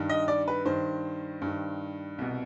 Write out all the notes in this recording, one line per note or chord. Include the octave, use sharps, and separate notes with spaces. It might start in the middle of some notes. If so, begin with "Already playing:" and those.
Already playing: G2 D#3
D#5
D5
B4
G2 D#3 C5
G2 D#3
C2 B2